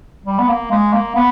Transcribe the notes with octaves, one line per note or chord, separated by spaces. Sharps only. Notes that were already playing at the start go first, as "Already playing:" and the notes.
G3
B3
A#3
G#3
A#3
B3